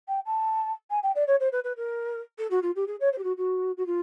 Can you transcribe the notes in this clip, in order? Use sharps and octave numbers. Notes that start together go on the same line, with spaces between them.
G5
A5
G#5
G5
D5
C#5
C5
B4
B4
A#4
A4
F#4
F4
G4
G#4
C#5
C5
G4
F#4
F#4
F#4
F4